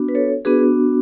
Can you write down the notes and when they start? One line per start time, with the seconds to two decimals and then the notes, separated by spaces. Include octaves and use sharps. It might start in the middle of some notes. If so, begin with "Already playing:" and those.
Already playing: B3 D4 F#4
0.09 B4
0.15 A4 C#5
0.45 B3 D4 F#4 G#4 B4